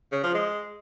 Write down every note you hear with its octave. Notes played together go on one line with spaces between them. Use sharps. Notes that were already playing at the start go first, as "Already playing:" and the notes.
C#3
F3
G#3